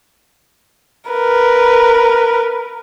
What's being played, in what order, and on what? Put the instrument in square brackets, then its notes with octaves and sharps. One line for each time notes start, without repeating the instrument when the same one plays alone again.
[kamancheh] A#4 B4